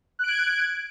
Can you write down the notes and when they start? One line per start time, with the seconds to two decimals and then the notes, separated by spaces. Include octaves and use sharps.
0.19 F#6
0.24 D7
0.28 G#6